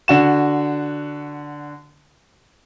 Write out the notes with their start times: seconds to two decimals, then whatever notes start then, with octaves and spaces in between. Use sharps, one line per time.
0.08 D3 F#4 E7